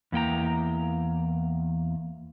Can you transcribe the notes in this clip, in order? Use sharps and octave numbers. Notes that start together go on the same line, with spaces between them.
E2 A#3 G5 A#5